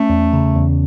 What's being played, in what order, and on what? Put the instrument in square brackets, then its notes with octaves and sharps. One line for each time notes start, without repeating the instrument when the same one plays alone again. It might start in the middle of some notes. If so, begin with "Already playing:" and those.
Already playing: [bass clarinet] A3 [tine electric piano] C#4
[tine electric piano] E2
C#3
E2